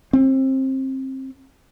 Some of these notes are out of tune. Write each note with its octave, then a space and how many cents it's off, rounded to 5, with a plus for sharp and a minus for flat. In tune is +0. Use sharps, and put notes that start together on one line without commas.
C4 +25